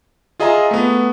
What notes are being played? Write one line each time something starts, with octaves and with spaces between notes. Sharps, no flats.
F4 G#4 D#5 E5 A#5
A3 B3